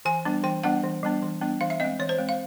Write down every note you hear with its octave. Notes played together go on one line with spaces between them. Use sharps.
E3 G#5
G3 B3 D4
E3 G5
G3 B3 D4 F#5
E3
G3 B3 D4
E3
G3 B3 D4
E3 F5
E5
G#3 C4 D#5
E3 C#5
C5
G#3 C4
F5